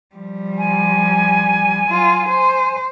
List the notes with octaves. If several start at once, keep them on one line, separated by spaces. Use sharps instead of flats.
F3 G3
G#5
F#3 F4
C5